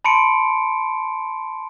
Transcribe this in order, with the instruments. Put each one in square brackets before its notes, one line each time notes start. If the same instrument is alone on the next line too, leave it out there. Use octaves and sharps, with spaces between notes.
[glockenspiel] A5 B5 C6 C#7 D7